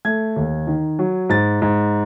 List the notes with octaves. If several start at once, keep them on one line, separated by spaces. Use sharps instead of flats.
A3 G#6
D#2
D#3
F#3
G#2 A6
G#2